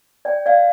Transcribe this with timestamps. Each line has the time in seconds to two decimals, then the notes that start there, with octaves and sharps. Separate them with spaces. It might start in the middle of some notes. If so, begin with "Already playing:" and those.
0.25 D5 G5
0.46 D5 F5